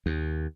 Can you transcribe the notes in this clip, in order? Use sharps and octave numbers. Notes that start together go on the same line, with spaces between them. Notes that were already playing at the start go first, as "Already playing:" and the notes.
D#2